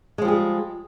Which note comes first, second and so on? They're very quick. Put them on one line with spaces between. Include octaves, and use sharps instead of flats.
G#3 F3 G3 G#4